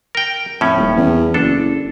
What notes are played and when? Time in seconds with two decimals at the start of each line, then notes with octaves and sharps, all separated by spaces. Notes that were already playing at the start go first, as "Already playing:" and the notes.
0.15 A#4 G5
0.61 F2 A2 C#4
0.77 D#1
0.97 E2
1.34 F#1 D4 A4